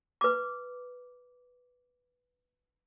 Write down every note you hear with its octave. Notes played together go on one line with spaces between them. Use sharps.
B4 D6